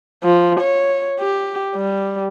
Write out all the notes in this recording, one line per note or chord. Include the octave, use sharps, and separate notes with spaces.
F3
C#5
G4
G3